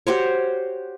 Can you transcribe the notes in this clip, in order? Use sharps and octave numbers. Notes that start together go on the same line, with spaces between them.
F#4 G4 C5 C#5